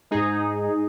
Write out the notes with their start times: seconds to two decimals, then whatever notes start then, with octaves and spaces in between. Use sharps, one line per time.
0.11 G#2 G#3 D#4 G#4